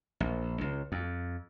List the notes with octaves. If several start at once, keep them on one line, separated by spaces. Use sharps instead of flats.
A#1
C#2
F2